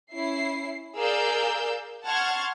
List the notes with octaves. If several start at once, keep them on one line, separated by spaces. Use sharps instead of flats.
C#4 E4 C7
G#4 A#4 D5 F5 E6 G6
F#5 A5 C6 C#6 F6 G#6